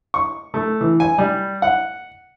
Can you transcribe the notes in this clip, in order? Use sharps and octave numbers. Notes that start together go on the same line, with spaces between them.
C#6
A3
E3
G#5
G3
F#5